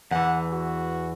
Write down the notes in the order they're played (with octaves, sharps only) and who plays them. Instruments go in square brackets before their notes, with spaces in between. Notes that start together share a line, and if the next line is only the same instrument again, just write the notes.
[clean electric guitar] E2 E3 [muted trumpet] F#5
[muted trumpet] F#4